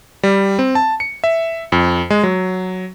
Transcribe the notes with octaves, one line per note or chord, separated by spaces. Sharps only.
G3
C4
A5
C#7
E5
F2
G#3
F#3